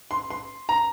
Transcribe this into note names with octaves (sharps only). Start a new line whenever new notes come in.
C6
C6
A#5